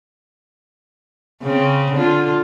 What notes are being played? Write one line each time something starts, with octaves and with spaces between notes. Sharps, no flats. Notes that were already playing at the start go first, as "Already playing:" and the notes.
C#3 C4
D3 F4